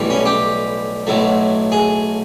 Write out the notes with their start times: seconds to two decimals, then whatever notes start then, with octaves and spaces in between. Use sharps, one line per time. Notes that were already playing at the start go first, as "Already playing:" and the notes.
Already playing: B1 A2 E3 G3
0.10 C#4
0.26 G4
1.07 B1 A2 F#3 A3
1.72 G#4